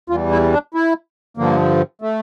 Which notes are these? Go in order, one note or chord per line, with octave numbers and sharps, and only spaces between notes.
E2 E3 G3 F4
E4
D4
E4
G2 D3 F3 A#3
A3